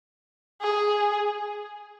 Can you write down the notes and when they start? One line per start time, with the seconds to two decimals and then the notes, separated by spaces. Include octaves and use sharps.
0.62 G#4